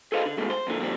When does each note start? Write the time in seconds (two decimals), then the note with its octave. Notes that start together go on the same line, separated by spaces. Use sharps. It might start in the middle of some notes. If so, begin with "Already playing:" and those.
0.12 G#4 A4 B4 C5 D#5 F5
0.26 D3
0.38 D#2 B2 G#3 A3
0.50 C5
0.67 F2 A#2 D3
0.80 A#2 D3 F3 G3 C4